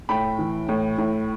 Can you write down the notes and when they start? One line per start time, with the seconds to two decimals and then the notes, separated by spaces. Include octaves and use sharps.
0.09 A2 G5 B5
0.39 E3
0.69 A2
0.98 A2